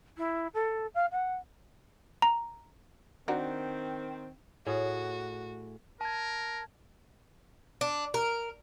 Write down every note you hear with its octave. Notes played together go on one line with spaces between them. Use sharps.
E4
A4
F5
F#5
A#5
D#3 C4 D4 F#4 A#4
A2 F#4 G#4
A#4 A5 G#6
D4
A#4